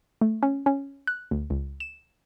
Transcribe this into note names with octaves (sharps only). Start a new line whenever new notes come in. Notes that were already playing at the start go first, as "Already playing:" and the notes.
A3
C#4
C#4
F#6
D2
C#2
E7